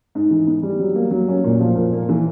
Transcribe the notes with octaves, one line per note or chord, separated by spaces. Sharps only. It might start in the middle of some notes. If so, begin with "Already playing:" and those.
G#2
E3
B3
G3
F#3
A#3
F#3
C#4
A#2
F3
A#2
A#3
E3